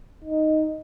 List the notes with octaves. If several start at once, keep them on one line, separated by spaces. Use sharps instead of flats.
D#4